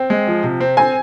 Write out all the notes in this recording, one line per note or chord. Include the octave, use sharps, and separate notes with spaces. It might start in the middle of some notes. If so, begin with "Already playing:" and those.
Already playing: C4 G5
G#3
F3
C3
C4
C4 G#5